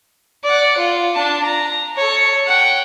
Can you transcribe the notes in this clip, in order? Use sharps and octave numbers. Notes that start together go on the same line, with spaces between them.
D5 F#5
F4
D4 A5
A#5
A4 C#5
F#5 G5